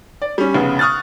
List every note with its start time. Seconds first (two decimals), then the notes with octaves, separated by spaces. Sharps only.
0.22 D5
0.38 G3 C#4
0.54 F1 C#3 B3
0.79 C#6 D#6 F6 F#6 A6